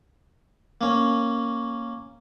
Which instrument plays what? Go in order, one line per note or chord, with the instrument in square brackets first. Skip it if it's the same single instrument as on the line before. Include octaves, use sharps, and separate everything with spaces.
[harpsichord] A#3 C#4